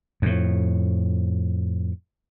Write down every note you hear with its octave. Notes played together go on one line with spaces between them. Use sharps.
F2 A2